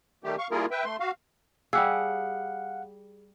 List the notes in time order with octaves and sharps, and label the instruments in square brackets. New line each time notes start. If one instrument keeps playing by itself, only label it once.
[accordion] D#3 G3 A3 G4
F5 C#6
G3 A#3 E4 F4 G#4 A#4
B4 E5 G5
A3 C6
F#4 F5
[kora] G3 G4 G#4 [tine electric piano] F5 F#5 [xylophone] E6